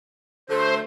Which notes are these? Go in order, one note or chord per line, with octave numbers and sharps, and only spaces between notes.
D3 F#3 A3 C5